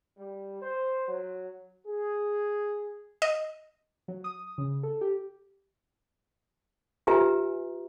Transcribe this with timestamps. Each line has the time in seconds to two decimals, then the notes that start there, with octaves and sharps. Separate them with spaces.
0.17 G3
0.61 C5
1.08 F#3
1.86 G#4
3.22 D#5
4.08 F#3
4.24 D#6
4.58 C#3
4.83 A4
5.01 G4
7.07 F4 G4 B4 E5 G#5 A#5